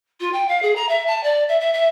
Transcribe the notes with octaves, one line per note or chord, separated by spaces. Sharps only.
F4
G5
F5
G#4
A#5
E5
A5
D5
E5
E5
E5